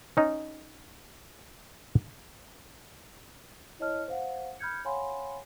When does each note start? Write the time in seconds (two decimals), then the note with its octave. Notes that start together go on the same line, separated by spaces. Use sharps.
0.17 C#4 D#4 D#5
3.79 E4 C#5 D#5 A5 F6
4.08 C5 F5 F#5
4.59 B5 F6 G6 G#6 C#7
4.85 C#5 F5 F#5 G#5 B5 C6